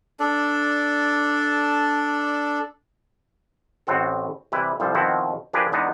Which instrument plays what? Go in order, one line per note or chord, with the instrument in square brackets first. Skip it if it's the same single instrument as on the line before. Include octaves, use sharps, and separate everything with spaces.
[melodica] D4 A4 D5
[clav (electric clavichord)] A1 A2 C4 F#4 A4
C3 E3 G3 E4 B4
C2 F3 G3 A4 C5
B2 D#3 F3 C4 E4 F#4
F3 D4 G4 G#4 A#4 B4
E2 G#3 B3 D4 D#4